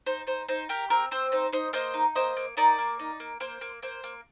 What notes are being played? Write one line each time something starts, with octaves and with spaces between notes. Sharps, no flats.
D#4 C5
D#4 C5
D#4 C5
G4 A#4
C4 A#4
C4 C5
D#4 C5
D#4 C5 D#5
A#3 C5 D#5
D#4
A#3 C5 D#5
A#3
D#4 A#4 D5
A#3
D#4
A#3
A#3 C5
A#3
A#3 C5
A#3